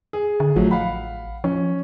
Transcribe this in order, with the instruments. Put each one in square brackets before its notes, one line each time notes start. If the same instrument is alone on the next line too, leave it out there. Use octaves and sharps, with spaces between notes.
[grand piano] G#4
[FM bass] D3
[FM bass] A1 [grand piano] F3 F#3 A3
[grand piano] F5 F#5 B5
[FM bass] F3 [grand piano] C#4